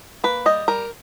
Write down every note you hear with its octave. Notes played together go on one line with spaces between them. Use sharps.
A#3 B4
G3 D#5
G3 A#4